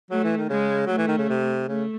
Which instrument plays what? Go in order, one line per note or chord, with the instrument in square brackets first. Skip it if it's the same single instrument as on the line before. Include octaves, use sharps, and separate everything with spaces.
[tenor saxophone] F#3 [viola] A3
[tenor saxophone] E3
D#3
[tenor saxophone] C#3 [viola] G#3
[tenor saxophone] F#3 [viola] A3
[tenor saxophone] E3
D#3
C#3
C3
[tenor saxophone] C#3 [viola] A3